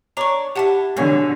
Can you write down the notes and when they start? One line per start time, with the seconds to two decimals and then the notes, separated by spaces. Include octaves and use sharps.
0.17 D4 C#5 D5 A#5 C#6
0.55 D4 E4 G4 F#5 A5
0.97 B2 D3 C#5 G#5